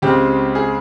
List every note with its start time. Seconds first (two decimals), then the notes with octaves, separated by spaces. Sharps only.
0.02 C#2 C#3 G#3 C4 G4
0.55 G#4